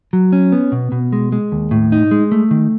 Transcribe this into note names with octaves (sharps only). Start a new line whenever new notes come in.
F#3
C#4
B3
B2
B2
G#3
G#3
D#2
A2
D#4
G#3
A3
D#3